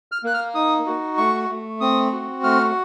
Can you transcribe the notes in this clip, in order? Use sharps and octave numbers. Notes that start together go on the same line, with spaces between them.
F6
A#3 F#6
F6
D#4 D#6
F#4
A3 C#6
A3
C4 D#6
F#4
A3 F6